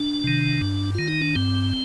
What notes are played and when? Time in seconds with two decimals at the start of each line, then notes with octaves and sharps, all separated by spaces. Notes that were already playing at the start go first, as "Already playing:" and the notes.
Already playing: D4
0.24 C3 D#3
0.61 G2
0.95 D#3 F4
1.08 D#4
1.22 D4
1.36 G2 C4